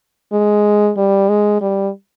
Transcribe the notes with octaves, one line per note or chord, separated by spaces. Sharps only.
G#3
G3
G#3
G3